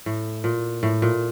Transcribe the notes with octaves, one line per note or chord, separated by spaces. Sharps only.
A2
A#2
A2
A#2